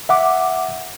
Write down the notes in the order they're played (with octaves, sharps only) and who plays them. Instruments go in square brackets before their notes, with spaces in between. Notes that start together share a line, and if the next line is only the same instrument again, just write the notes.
[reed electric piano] E5 F#5 D6